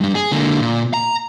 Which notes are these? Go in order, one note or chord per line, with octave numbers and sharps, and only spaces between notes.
G2 G3
G#4
D3 A#3
A#2
A#5